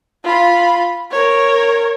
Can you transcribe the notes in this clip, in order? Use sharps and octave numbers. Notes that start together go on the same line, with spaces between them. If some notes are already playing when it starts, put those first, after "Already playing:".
F4 B5
A#4 C#5